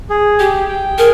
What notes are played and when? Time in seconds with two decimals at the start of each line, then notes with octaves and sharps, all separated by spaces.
0.10 G#4
0.39 G4 G5
0.68 G5
0.98 G#4 A#4